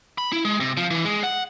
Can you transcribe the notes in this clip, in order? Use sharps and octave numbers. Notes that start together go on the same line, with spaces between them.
B5
E4
G#3
C3
F3
E3
G#3
F#5